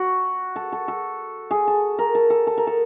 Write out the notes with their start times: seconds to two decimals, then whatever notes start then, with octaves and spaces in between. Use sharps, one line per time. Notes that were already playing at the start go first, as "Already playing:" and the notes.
Already playing: F#4
0.56 A4
0.72 A4
0.88 A4
1.51 G#4
1.67 A4
1.99 A#4
2.15 A4
2.30 A4
2.47 A4
2.58 A#4
2.67 A4